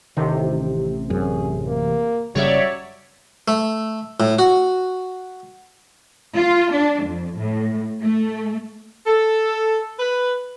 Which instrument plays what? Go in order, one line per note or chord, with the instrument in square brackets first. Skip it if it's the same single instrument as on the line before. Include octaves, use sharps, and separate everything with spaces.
[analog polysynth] A1 C3 [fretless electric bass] D#3
[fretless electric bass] F#2 [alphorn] G#4
[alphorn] A#3
[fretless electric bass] F#1 C#3 G3 [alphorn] F#3 [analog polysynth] C#5 D5 E5
[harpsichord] A3
A2
F#4
[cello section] F4
D4
F2
A2
A3
[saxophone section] A4
B4